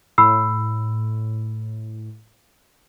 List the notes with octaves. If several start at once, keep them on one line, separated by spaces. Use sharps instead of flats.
A2 B5 E6 C7